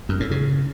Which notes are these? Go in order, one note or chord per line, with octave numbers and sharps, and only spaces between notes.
F#2
A2
C#3